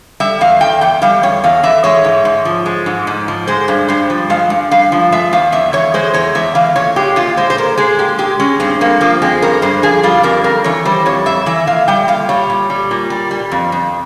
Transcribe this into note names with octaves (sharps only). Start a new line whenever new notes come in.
G3 E5
E2 F5
E2 G5
E3 G5
G3 F5
E2 C#5
E2 F5
E3 E5
G#3 C#5
G#2
G#2
F3
G#3
G#2
G#2
F3
G#3 C5
G2
G2 C5
F3
G#3 F5
G2
G2 F5
F3
G#3 E5
E2 F5
E2 E5
E3 C#5
G#3 C5
E2 C#5
E2 E5
E3 F5
A#2 C#5
G#3 G4
A#2 F4
G#3 C5
C5
A#2 A#4
G#3 G#4
A#2 G4
G#3 G4
G#3 C#4
G2 C4
G2 A#3
F3 A#3
G#3 C4
G2 A#4
G2 C5
F3 G#4
G3 F4
F2 A#4
F2 A#4
E3 C#5
G3 C5
F2 C#5
F2 E5
E3 E5
A#2 F5
G3 G5
A#2 F5
G3 C#5
A#2
G3
A#2
G3
G3
F2
F2